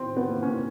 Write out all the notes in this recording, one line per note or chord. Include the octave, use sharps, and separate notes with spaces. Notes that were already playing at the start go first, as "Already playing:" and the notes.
Already playing: C4
B3
A#3
C#4